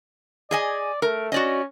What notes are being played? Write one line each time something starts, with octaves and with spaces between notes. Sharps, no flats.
G#4 D5 D#5 G#5
A3 A#4
C#4 F#4 D5 D#5